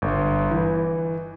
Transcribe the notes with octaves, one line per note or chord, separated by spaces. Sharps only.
G1
E3